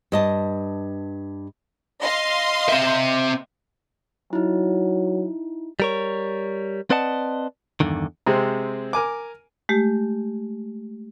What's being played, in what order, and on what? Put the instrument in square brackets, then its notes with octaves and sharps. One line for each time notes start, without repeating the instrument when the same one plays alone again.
[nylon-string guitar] G2 D#5 A5
[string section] D#5 F5 C6
[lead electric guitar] C4 E5
[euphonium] F#3 [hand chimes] D#4 E4
[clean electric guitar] G3 A#4 C#5
C4 B4 D5 D#5 F#5 A5
E2 G2 D3 D#3
[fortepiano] C3 G#3 C4
A#4 G#5 D6
[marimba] G#3 A3 G4